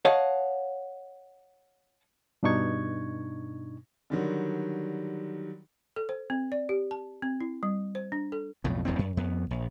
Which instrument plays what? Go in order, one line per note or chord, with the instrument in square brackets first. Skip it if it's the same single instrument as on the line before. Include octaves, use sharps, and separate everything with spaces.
[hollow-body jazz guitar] C#5 D#5 F5 F#5 A5
[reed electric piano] G2 B2 D4 D#4 C#6 G#6
[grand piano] D3 D#3 F#3 G3
[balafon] A4
C5
C4
D5
G4
A5
C4
E4
G3
C5
D4
A4
[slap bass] B1 F2 A2
D#1 E2 G2 C4
F#2
F2 B3
A#1